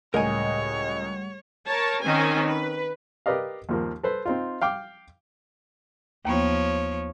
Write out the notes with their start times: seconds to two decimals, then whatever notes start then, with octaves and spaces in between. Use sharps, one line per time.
0.14 C#2 A2 G3 A#4 C#5 D#5 F#5 G#5
1.67 A#4 C#5 A5
2.02 D#3 C4 C#4 G#5
2.46 B4
3.26 G4 A#4 B4 D5 D#5 F5
3.69 D#2 F3 A#3
4.03 A4 B4 C5
4.26 C4 D#4 F4
4.62 F5 G5 D6
6.25 D#2 F3 A#3 B3 C#5